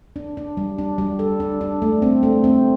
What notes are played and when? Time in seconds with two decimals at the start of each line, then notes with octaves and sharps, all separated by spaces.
0.16 D4
0.37 D4
0.57 G3
0.78 D4
0.98 G3
1.19 A4
1.40 D4
1.61 D4
1.82 A3
2.02 C4
2.23 A3
2.44 C4